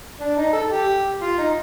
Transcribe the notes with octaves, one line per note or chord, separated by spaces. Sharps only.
D4
D#4
A4
G4
F4
D#4